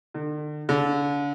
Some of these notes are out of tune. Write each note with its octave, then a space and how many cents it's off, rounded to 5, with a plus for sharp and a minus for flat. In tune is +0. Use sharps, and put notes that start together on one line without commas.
D3 +40
D3 -35